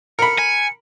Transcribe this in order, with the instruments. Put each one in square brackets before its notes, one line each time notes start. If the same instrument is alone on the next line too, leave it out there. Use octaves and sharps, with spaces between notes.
[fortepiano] A#4 B5 [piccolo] C#7
[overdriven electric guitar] G#5